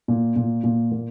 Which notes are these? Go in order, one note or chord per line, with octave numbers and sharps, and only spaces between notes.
A#2
A#2
A#2
A#3